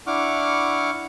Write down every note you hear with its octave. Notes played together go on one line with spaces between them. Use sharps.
D4 E4 F#5 C#6 D6 F6